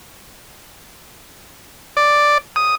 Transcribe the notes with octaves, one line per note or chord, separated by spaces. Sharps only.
D5
D#6